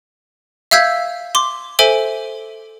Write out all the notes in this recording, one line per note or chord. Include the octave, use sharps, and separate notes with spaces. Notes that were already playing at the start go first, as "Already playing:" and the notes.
E5 F5 E6 G6 G#6 B6
C6 D6
A4 C5 E5 G#5 D7 G7